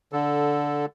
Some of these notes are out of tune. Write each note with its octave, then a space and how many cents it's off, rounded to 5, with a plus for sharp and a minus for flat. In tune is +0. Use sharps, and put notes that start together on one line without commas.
D3 -10 A4 +0